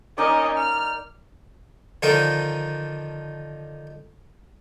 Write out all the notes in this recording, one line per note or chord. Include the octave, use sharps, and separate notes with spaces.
A#3 C#4 D#4 D5 D#5
F6
D3 D#3 F3 D#4 A#4